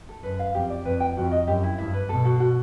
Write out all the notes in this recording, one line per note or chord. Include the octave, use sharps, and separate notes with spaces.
A4
F#2 B4
F5
F2 G4
D5
F2 B4
G5
F2 F#4
D#5
F#2 G4
E4
G2 E4
B4
B2 A4
F#4
F#4